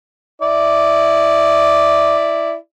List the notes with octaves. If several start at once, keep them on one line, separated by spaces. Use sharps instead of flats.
E4 D5